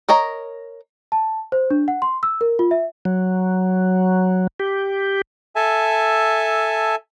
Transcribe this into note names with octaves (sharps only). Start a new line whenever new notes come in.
A#4 C#5 D#5 A#5
A5
C5
D4
F#5
C6
E6
A#4
F4
E5
F#3
G4
A4 E5 G#5 A5